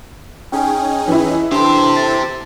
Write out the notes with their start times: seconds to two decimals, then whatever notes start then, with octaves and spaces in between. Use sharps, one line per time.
0.52 C#4 D#4 G#4 G5 G#5
1.08 E3 E4
1.52 D4 G4 A4 C5 C6 C7
1.96 A6